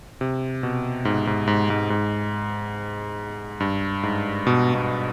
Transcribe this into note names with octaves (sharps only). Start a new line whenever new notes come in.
C3
B2
G#2
G#2
G#2
G#2
G#2
G2
G#2
B2
B2